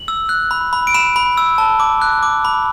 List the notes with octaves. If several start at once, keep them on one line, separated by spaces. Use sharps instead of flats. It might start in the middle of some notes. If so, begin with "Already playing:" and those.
Already playing: F#7
E6
F#6
B5
B5
D7
B5 E7
B5
E6
A5
D6
F#6
D6
B5